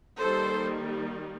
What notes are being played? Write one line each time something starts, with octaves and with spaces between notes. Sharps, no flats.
D#3 G3 A#3 D#4 A4 C5